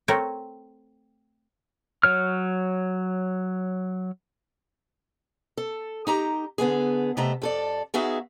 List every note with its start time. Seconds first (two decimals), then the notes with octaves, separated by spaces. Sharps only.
0.08 A3 C4 A#4 C#5
2.03 F#3 C#5 F6
5.57 A4
6.07 D#4 G4 A#5
6.58 D3 B3 D#4 G#4
7.17 C3 A3 B3 D#5 E5 A#5
7.42 F2 A4 D5
7.94 B3 D#4 F#4 G#4 E5 F5